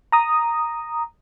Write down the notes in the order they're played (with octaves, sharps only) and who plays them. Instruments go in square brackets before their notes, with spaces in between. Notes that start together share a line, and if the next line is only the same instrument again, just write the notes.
[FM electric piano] A#5 D#6